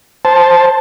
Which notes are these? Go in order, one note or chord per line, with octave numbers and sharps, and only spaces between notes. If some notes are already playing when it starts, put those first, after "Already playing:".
C5 A5